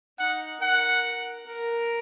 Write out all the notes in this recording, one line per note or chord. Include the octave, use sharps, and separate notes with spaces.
D#4 F#5
A#4 F#5
A#4